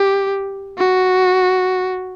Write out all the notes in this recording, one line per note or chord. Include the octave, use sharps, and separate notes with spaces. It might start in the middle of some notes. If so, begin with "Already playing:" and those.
Already playing: G4
F#4